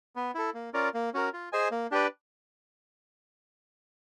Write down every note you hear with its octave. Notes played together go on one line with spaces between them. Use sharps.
B3
E4 A4
A#3
C#4 F4 A#4 D5
A#3
C#4 F#4 A#4
F4
G#4 C5 D#5 G#5
A#3
D4 G4 B4 D5